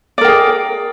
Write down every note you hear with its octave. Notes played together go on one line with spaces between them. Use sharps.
G#4 A#4 D5 G5